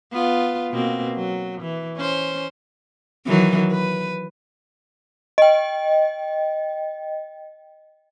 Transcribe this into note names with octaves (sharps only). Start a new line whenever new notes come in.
B3 F4
B2 A#3 C4
F#3
E3
C#4 C5
D#3 E3 F#3
B4
D#5 G5